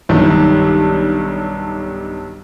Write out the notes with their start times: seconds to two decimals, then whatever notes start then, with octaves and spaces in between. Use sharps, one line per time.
0.09 B1 G2 D#3 G3 A#3